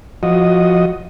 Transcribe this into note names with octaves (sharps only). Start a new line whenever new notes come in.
F3 F#4 D#5